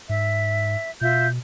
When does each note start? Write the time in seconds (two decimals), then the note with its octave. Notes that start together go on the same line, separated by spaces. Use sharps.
0.09 G#2 E5
1.01 B2 F4 E5 G6